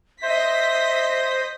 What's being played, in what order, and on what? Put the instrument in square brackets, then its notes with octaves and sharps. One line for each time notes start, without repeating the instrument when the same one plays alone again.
[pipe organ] C5 [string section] D#5 A#6 B6 [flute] E5